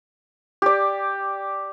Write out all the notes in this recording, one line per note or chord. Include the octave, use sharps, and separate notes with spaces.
G4 D5